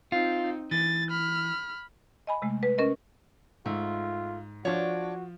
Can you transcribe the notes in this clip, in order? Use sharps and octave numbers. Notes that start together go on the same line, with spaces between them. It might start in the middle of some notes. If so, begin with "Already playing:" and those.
C4 D#4 F4
E3 A6
B5 F6
D#5 G#5 B5
C3 G#3 A3
B4
C#4 A#4 D#5
G#2 A3 F4
F3 D4 F4 F#4 C#5